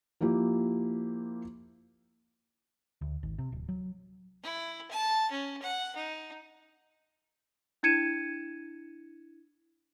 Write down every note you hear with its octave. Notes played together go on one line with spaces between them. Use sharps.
F3 A#3 E4 G4
D2
G#1
C3
D1
F#3
E4
A5
C#4
F#5
D#4
D4 E4 G#6 C#7 D#7 E7